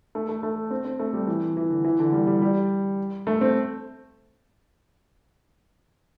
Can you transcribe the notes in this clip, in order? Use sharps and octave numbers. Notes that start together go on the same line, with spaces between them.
A3
A3
A3
C4
C4
A3
G3
E3
E3
D3
E3
D3
G3
G3
G3
A3
C4